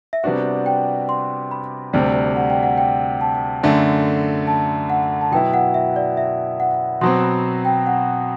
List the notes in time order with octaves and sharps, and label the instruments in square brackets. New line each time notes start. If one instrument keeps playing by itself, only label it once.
[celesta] E5
[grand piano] C3 G3 B3 D4 F#4 [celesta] F#5
[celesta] G5
C6
B5
[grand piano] D2 C3 G3 [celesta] G5
[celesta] F#5
G5
F#5
G5
A5
[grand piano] F#2 D3 A3
[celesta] A5
F#5
A5
[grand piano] B2 F#3 B3 E4 [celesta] G5
[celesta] F#5
E5
D5
E5
F#5
[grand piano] B2 F#3 C4 [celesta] C6
[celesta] B5
G5
F#5